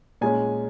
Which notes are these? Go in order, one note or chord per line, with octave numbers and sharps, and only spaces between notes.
A#2 G#3 C#4 G#5